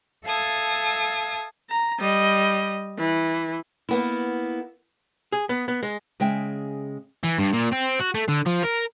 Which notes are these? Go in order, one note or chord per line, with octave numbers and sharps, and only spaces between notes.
A4 E5 F5 A5 D#6 G#6
A#5
G3 D#5
E3
A#3 B3 E4
G#4
B3
B3
G#3
C#3 G#3 E5 G5
E3
G2
A#2
C4
F#4
A3
D3
F3
A#4